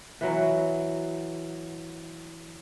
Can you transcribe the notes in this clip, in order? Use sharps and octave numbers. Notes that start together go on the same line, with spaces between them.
E3 F#3